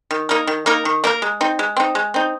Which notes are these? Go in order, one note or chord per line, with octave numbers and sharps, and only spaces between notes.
D#3
A#3 D#4 A#4
D#3
A#3 D#4 A#4
D#3
A#3 D#4 A#4
G#3
C4 D#4
G#3
C4 D#4
G#3
C4 D#4